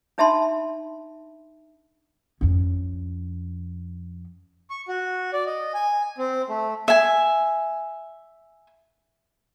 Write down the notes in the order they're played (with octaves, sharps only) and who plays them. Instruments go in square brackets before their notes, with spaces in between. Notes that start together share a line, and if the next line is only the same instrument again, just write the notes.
[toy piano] D4 D#4 E5 A5 B5 C6
[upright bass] F2 C#4
[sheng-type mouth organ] C#6
F#4
D5
D#5
G#5
C4
A3
[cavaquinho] E5 G#5